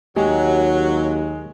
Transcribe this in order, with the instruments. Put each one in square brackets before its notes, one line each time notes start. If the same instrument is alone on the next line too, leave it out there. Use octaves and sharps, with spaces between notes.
[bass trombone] D#2 [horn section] F#3 [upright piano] G#3 [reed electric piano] G4